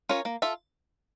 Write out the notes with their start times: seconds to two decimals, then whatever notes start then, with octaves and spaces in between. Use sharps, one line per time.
0.09 C#4 F4 A#4 C#5
0.25 A#3
0.42 F4 A4 E5